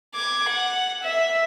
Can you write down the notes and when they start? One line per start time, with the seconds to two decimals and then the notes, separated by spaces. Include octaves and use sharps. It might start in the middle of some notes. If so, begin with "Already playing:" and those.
0.15 D6 G#6
0.49 F#5
1.03 E5